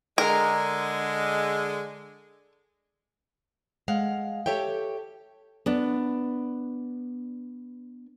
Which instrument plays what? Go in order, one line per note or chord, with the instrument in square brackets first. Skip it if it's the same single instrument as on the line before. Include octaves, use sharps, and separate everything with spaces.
[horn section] D3 G#3 [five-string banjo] A#4
[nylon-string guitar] G#3 F5 F#5
G4 A4 C#5 E5 G5
B3 D4